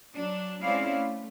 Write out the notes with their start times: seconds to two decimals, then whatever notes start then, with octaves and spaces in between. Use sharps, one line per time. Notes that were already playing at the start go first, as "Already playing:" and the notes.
0.14 F#3 D4
0.61 G#3 C4 C#4 E4 D5 F5
0.91 A3